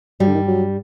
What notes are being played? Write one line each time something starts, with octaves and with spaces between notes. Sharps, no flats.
G2 F#3 G3
D3
D#3
F#3